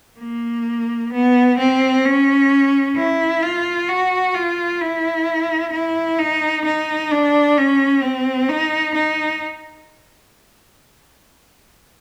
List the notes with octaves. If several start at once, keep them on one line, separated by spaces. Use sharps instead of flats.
A#3
B3
C4
C#4
E4
F4
F#4
F4
E4
E4
D#4
D#4
D4
C#4
C4
D#4
D#4